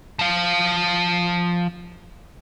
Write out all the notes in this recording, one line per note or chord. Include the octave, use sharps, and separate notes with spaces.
F3 F5